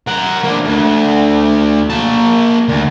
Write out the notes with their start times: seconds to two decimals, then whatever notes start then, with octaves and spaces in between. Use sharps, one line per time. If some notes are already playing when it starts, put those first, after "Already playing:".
0.08 A#4 F#5
0.44 A#3 D4
0.65 D2
1.90 A#3 A5
2.68 D2